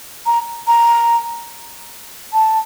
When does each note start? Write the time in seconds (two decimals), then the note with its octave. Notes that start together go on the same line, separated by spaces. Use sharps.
0.26 A#5
0.67 A#5
2.33 A5